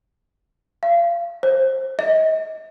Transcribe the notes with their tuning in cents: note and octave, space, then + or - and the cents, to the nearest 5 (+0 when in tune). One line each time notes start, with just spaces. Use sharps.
F5 -30
C5 +20
D#5 +35